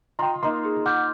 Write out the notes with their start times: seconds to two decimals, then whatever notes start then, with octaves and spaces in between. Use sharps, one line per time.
0.19 F4 D#5 G5 A#5 C6
0.43 A#3 D#4 C6
0.65 G#4
0.86 F#5 D6 F6 G6